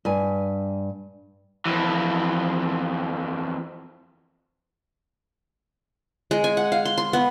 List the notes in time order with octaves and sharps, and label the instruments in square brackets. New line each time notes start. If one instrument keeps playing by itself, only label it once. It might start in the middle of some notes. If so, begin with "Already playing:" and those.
[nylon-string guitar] G2 G#5
[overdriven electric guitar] F2 E3
[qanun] G#3
G#5
F#5
F5
C6
C6
B3